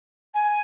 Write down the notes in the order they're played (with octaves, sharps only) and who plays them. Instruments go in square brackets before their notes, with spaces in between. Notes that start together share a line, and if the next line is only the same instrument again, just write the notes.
[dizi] G#5